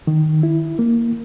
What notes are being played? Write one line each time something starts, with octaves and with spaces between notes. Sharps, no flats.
D#3
E4
A#3